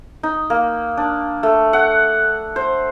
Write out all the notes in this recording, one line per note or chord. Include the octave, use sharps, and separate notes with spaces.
D#4
A#3
D4
A3
F#5
C5